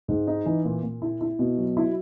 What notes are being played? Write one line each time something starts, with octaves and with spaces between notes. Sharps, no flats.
G#2
D#4
E3
A#2
A#2
E4
E4
B2
F#3
E4